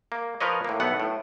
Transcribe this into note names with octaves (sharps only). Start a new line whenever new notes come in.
A#3
F3 A#4 B4 C#5 D#5
A2 A#3
B1 A3 B3 F#5
A2